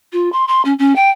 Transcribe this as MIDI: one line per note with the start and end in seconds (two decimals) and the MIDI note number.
0.13 0.31 65
0.32 0.45 84
0.48 0.62 84
0.65 0.73 61
0.79 0.95 61
0.96 1.10 79